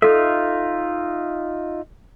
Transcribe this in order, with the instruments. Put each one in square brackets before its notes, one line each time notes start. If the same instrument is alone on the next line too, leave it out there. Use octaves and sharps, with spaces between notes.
[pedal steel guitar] D#4 F4 E5 [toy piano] A4